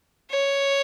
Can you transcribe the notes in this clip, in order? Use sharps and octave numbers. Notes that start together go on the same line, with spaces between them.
C#5